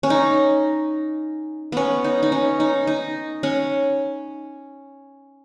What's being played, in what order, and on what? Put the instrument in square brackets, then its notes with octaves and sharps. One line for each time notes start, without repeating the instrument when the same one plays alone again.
[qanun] C#4
D#4
B3 C#4
D#4
D#4
C#4
D#4
D#4
C#4